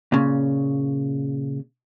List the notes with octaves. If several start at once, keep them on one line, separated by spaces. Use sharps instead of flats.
A#2 C#3